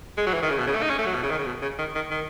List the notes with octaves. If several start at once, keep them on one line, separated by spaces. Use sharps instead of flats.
G#3
F#3
E3
D#3
C#3
B2
C#3
A3
D#4
C#4
A3
F#3
B2
C#3
D#3
C#3
B2
C#3
D#3
D#3
D#3